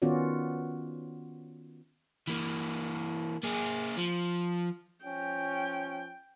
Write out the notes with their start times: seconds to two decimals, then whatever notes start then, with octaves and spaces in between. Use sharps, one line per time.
0.02 D#3 B3 C#4 F4 F#4 D5
2.28 E3 A#3
3.43 A#3 G#4
3.97 F3
5.06 F3 C#4 G5